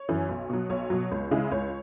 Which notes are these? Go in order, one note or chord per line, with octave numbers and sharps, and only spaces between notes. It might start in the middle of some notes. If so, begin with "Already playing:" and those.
Already playing: C#5
F#2 E3
B1
B2 F#3
B1 C#5
B2 F#3
C#2
C#3 G#3 E4
C#2 C#5